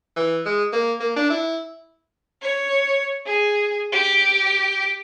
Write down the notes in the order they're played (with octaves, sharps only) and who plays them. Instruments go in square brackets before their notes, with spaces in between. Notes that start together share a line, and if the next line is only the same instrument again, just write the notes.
[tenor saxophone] E3
G#3
A#3
A#3
D4
E4
[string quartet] C#5
G#4
G4